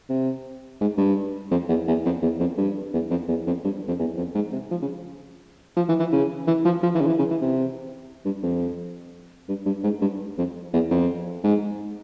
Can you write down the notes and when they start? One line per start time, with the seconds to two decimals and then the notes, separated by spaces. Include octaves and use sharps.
0.09 C3
0.81 G#2
0.98 G2
1.51 F2
1.69 E2
1.88 E2
2.05 F2
2.22 E2
2.40 F2
2.57 G2
2.93 E2
3.11 F2
3.28 E2
3.47 F2
3.64 G2
3.88 F2
3.99 E2
4.17 F2
4.35 G#2
4.52 C3
4.71 F3
4.82 C#3
5.77 F3
5.89 E3
6.00 E3
6.12 C#3
6.47 E3
6.65 F3
6.83 F3
6.95 E3
7.01 C#3
7.07 E3
7.19 C#3
7.31 E3
7.41 C3
8.25 G2
8.42 F2
9.49 G2
9.66 G2
9.83 G#2
10.02 G2
10.38 F2
10.73 E2
10.91 F2
11.44 G#2